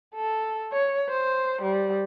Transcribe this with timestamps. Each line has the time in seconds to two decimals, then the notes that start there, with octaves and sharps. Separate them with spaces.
0.15 A4
0.73 C#5
1.09 C5
1.62 G3